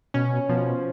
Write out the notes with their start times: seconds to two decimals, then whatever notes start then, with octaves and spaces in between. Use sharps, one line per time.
0.14 B2 C#4
0.49 B2 F3